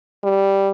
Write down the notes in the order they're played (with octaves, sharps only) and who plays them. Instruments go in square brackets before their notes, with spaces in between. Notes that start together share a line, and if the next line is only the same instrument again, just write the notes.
[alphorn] G3